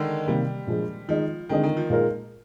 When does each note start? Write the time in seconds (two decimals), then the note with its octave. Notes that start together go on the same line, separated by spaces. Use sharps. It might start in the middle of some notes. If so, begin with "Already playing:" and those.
Already playing: D3 D#3 G#3
0.27 C3 D#3 G3 A#3
0.67 A#2 F3 G#3 D4
1.08 D#3 F3 G#3 D#4
1.49 D3 D#3 G#3 C4 D#4 G#4
1.63 D#3
1.77 F3
1.90 A#2 G#3 D#4 A#4